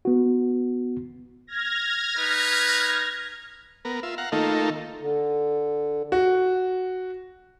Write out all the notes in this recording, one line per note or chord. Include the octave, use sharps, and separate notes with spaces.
B3 F#4
F6 G#6 A#6
D#4 B4
B3 A#4
F4 E5
F5 F#5 A#5
D#3 A3 A#3 D#4 F4 A4
D3
F#4